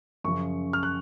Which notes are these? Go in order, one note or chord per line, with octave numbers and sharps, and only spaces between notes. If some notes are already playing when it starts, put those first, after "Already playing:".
F#2 C#3 F3 C#6
F6
F#6